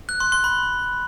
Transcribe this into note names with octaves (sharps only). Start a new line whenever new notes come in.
F#6
C6
C6
B5